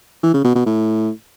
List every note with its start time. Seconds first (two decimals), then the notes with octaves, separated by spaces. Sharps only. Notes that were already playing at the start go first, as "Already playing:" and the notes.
0.23 E3
0.34 C#3
0.44 B2
0.55 B2
0.66 A2